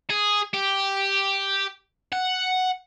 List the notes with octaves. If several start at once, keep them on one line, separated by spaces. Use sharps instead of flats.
G#4
G4
F#5